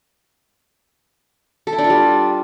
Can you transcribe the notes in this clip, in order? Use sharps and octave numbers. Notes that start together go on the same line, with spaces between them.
A4
E4
D4
F4
G3